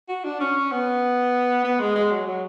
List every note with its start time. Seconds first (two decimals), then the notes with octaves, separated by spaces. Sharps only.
0.09 F#4
0.24 D4
0.40 C#4
0.71 B3
1.65 B3
1.80 G#3
1.95 G#3
2.11 F#3
2.27 F#3